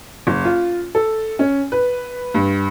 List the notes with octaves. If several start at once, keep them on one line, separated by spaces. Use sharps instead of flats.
F#1
F4
A4
C#4
B4
G2